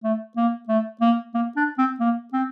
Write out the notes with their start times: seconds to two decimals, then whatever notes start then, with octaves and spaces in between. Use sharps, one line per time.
0.03 A3
0.37 A#3
0.68 A3
1.01 A#3
1.34 A#3
1.57 D4
1.78 C4
2.00 A#3
2.33 C4